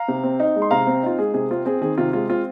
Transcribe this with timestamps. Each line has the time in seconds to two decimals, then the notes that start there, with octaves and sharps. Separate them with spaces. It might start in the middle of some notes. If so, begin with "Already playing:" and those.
Already playing: F5 A#5
0.08 C3
0.23 C4
0.40 D#4
0.56 G#3
0.62 C6
0.71 C3 F5 A#5
0.87 C4
1.03 D#4 F4
1.18 G#3 G#4
1.34 C3 G#4
1.51 C4 F4
1.66 C4 G#4
1.81 D#3 G#4
1.98 C3 F4
2.13 G#3 F4
2.29 C4 F4